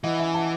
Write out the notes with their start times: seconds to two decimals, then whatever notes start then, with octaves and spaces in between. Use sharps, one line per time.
0.04 E3 D#5 F#5
0.19 E5 G#5
0.34 F#5 A5